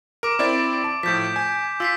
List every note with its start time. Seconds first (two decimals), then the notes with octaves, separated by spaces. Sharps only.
0.23 A#4 D6 D7
0.39 C4 E4 D5
0.84 A5
1.03 A2 F3 G6 B6
1.36 G#5
1.80 F4 E6 B6 C7